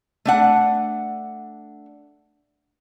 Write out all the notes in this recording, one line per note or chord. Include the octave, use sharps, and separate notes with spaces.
A3 D4 F#5